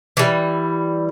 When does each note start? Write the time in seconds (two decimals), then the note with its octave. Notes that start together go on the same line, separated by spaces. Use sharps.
0.17 E3 G3